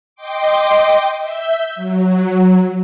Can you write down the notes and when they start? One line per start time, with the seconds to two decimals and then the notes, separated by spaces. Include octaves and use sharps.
0.15 D#5 G5 C6 D6
1.18 E5 G6
1.75 F#3